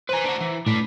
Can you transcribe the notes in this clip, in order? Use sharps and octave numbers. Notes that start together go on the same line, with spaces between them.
B4 C5 G#5 A#5
D4 F#4
E3
A2 D4 B4